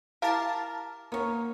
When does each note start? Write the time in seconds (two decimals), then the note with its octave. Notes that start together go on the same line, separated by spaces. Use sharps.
0.22 E4 G4 A#4 F5 A5
1.12 A#3 B3 C#4